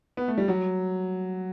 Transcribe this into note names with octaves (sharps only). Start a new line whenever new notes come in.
B3
A3
G3
F#3